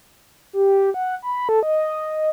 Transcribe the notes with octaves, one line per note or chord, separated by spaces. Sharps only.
G4
F#5
B5
A4
D#5